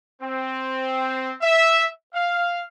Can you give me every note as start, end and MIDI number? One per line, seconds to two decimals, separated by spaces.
0.22 1.32 60
1.41 1.86 76
2.14 2.60 77